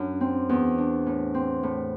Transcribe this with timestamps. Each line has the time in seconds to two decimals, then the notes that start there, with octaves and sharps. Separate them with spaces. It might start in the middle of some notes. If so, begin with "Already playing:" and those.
Already playing: F#2 D4
0.21 C4
0.49 E2
0.78 D4
1.06 A2
1.34 C4
1.63 A2